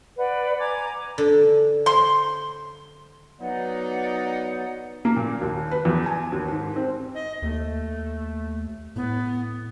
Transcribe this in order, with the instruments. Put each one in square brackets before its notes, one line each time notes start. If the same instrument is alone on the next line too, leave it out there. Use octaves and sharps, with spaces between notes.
[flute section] B4 D5 F#5
G#5 A#5 D6 G#6
[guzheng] D3
[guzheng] C5 [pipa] C6
[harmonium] F#3 B3 [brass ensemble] D#4 [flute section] D5 F#5
[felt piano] A#3
A#2
D#2
B4
E2
G#5
D#2
G#2
C4
[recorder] D#5
[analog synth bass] D#2 [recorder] A3
[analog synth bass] A2 [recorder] B3